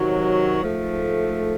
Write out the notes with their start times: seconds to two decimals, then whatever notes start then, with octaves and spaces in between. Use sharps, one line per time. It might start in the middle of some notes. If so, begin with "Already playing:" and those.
Already playing: C3 D#3 F#3
0.60 G#2 F3 A3